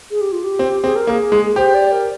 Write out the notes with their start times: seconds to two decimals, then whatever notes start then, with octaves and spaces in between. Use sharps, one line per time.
0.11 G#4
0.21 G4
0.32 F4
0.44 G4
0.59 C4
0.83 C4 G#4
0.96 A#4
1.07 A#3 G#4
1.32 G#3
1.56 G4 C5
1.74 D5
1.92 A#4